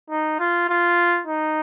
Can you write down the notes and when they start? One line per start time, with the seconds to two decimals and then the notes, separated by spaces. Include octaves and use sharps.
0.10 D#4
0.39 F4
0.69 F4
1.27 D#4